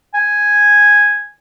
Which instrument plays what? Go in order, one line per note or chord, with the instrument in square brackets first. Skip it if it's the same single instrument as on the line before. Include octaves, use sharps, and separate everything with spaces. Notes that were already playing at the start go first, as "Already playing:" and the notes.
[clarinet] G#5